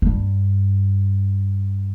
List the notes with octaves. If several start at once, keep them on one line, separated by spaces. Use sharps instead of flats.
G2